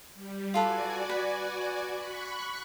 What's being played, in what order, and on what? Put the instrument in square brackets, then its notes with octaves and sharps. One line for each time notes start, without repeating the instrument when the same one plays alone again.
[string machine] G3
[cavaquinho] F4 A4 B4 [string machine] F#4 D5 G#5
[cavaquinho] B4
[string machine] B5 C#6 F#6